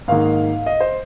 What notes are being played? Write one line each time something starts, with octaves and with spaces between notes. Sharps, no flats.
G#2 D#3 A#3 D#4 F5
D#5
C5